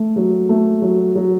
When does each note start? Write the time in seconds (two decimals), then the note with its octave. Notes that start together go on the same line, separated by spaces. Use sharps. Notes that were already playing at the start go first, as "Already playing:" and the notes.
Already playing: A3
0.16 F#3
0.49 A3
0.82 F#3
1.16 F#3